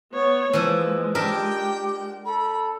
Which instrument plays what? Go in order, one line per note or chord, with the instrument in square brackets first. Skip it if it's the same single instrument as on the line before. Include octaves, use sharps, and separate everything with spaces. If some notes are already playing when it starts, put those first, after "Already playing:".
[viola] B3 C#5
[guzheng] E3 F3 [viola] G#3 [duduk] A#3 [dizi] E6
[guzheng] D4 A#4 E5 [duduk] G4 [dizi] G5
[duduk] A4 [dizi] B5